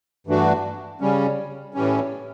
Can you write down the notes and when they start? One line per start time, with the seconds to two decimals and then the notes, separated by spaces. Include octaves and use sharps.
0.27 G2 E3 A3 D4 F#4
1.01 C#3 G3 C#4
1.74 A2 E3 G3 C#4